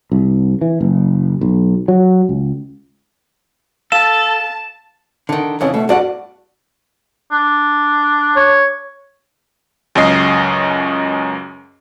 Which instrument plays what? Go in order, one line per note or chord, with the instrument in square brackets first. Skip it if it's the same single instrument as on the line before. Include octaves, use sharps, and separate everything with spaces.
[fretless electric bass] C2
E3
F#1
B1
F#3
C#2
[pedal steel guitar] A4 [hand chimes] F5 [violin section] A5 [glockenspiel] E7
[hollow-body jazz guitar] D3 D#3
[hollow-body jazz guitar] F2 C#3 E3 [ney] C#5
[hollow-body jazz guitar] B2 [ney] A3
[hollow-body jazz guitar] G2 D5 F#5 [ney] F#4
[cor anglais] D4
[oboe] C#5
[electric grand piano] C#2 F#2 C#4 D#5 C7